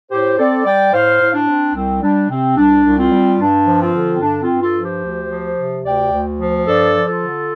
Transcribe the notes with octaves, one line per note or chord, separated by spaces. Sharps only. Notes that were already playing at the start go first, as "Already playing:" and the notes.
A2 G4 C5
C4 A4 D5
G3 D5 G5
A2 C5 F5
A2
D4
C4
C2 C4
G3 D4
C3 C4
C2 D4
C2
C4 F4
G3
G2 D4
F3
C4 F4
D3
C4
G2 D4
C4 F4
G2
F4 A4
F3
G4 C5
D2
F3
C3
D2 D5 G5
D2
F3
G2 A4 D5
F3
F4 A4
D3